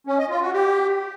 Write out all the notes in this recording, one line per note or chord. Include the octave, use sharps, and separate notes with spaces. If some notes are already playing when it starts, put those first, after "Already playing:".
C#4
D#5
F4
F#4
G4